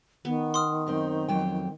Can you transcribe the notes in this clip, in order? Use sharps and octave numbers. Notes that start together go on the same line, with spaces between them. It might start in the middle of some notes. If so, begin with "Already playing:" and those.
D#3 B3
C6 D#6 F6
F#2 C4 D#4
F2 F#3 G5